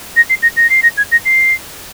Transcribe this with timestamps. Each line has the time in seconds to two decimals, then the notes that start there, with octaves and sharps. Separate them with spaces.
0.16 A#6
0.30 C7
0.43 A#6
0.57 A#6
0.70 C7
0.83 A#6
0.97 G#6
1.12 A#6
1.25 C7